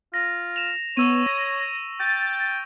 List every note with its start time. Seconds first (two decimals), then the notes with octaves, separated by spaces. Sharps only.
0.14 F4 A#6
0.56 E7 F7
0.97 B3 C#5 C#6 E6 D#7
1.26 A#6
2.00 G5 A6